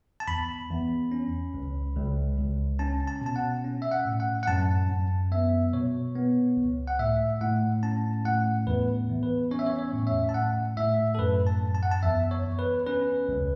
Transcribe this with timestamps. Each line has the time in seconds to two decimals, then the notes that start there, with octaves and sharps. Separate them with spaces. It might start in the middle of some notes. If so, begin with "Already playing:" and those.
0.20 A5
0.28 E2 B5
0.70 E2
1.11 C#4
1.54 C#2
1.96 C#2
2.38 C#2
2.79 C#4 A5
3.07 A5
3.21 B2 A5
3.36 F#5
3.64 C#4
3.82 E5
3.91 F#5
4.05 A2
4.20 F#5
4.43 F#5
4.47 F#2 A5
4.89 F#2
5.31 B3 E5
5.73 B2 C#5
6.16 B3
6.57 C#2
6.87 F#5
6.99 A2 E5
7.41 A2 F#5
7.83 C#4 A5
8.25 A2 F#5
8.67 E2 B4
9.09 E2
9.23 B4
9.51 C#4 C#5
9.59 E5
9.66 C#5
9.79 C#5
9.93 A2
10.07 E5
10.29 A5
10.34 A2 F#5
10.77 A2 E5
11.15 A4
11.19 F#2 B4
11.47 A5
11.61 F#2
11.75 A5
11.83 F#5
11.91 A5
12.03 E2 E5
12.31 C#5
12.45 E2
12.59 B4
12.87 C#4 B4
13.29 C#2